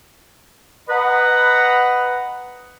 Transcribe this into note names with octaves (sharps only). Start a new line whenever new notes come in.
B4 D#5 F#5 A#5 B5